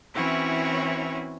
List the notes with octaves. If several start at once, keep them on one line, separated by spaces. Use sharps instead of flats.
E3 C4 C#4 E4 F#4 C#5